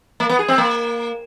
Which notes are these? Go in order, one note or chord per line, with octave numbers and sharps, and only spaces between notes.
A#3
B3
G#4
C4
A#3